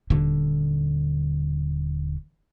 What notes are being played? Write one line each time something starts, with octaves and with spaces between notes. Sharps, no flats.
D#1 D3